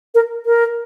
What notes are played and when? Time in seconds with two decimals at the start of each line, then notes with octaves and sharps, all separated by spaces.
0.15 A#4
0.46 A#4